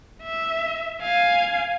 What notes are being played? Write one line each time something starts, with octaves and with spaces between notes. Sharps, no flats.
E5
F5 G#5